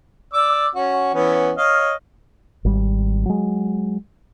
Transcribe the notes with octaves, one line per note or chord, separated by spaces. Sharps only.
D5 D6 E6
C#4 F#4
E3 B3 C#4
C#5 D#5 F5
G#1 G3
F#3 G#3